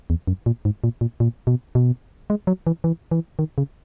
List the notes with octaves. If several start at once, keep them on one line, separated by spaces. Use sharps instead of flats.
E2
F#2
A#2
G#2
A#2
A#2
A#2
B2
B2
G#3
F#3
E3
E3
E3
D#3
C#3